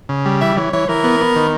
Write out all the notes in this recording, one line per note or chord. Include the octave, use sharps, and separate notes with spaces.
C#3
G3
E3 E5
E3 C#5
E3 C#5
E3 A#4
B3
B3
D#3